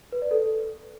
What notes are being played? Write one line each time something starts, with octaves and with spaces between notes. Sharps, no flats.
B4
D5
A4